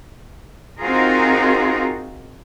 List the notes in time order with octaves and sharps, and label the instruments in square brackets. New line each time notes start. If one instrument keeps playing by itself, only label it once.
[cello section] C4 D#4 F4 F#4 G#4 A#4